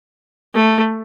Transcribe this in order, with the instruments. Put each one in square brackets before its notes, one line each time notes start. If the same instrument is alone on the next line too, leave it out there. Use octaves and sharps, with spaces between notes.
[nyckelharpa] A3